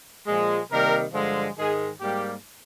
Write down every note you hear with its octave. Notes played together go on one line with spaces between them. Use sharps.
A#2 F3 G#3
C3 D#3 G3 A#3 A#4
G2 D3 F3 G#3
G#2 D#3 G#3 G#4
G#2 G3 A#3 G4